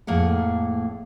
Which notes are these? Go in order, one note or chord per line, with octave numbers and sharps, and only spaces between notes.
F2 A2 A#3 G#4 F#5